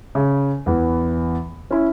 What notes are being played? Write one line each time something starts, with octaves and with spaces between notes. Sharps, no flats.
C#3
E2 E3
C#4 E4